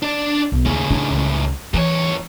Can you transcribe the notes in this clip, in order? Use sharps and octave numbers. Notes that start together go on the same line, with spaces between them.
D4 D5
B1
D#2 A2 C#3
D4 D#4
C#2
E2 E3 C#5